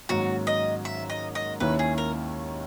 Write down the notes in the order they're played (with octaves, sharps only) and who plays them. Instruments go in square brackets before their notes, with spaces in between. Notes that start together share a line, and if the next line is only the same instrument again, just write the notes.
[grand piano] G#2 D#3 F#3 A#3 C#4 [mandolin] F#4
[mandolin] D#5
E5
D#5
D#5
[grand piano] D#2 D#3 A#3 C#4 E4 [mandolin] B4
[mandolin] G#4
A#4